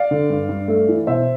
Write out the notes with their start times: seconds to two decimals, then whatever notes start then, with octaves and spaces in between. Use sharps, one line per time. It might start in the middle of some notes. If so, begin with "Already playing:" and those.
Already playing: D5 F5
0.11 D3
0.30 G2
0.49 G2
0.68 A3
0.89 E3
1.07 B2 C5 E5